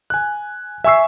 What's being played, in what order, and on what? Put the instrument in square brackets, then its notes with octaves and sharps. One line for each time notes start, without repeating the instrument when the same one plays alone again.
[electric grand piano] G#5 F#6
E5 G#5 C#6 E6 C7